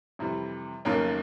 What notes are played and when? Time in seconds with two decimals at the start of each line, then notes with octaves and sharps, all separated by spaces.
0.19 F2 C3 E3 G3
0.85 F1 D#2 C#3 F#3 A#3